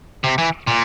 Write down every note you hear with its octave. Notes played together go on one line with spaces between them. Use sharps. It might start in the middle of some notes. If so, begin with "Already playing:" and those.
C3
E3
A#2